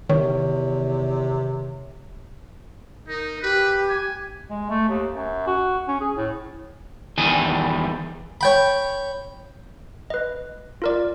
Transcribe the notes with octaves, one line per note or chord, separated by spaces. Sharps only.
E2 C3 D#3 C#5
D#4 A#4
G4 B4
G#5
G#3
A3
D#2
F#2
F#4
C#4
G#4
A2
E2 D#3 E3 G3 D#5 G#5
C#5 G5 B5
B4 D#5
F4 A#4 D5